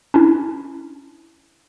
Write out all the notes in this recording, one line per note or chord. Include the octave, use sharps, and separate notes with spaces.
C#4 D4 E4